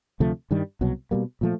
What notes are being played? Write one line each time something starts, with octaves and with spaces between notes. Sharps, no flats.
D2 C3 F3 A3
G2 D#3 G3
C2 B2 F#3
B2 G3 A#3
A#2 F3 A3